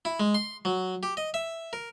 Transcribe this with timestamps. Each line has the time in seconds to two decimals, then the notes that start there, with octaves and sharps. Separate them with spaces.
0.05 E4
0.20 G#3
0.34 C6
0.65 F#3
1.03 G4
1.17 D#5
1.34 E5
1.73 A#4